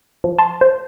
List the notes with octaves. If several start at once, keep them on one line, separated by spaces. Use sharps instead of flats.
F3
A5 C6
C5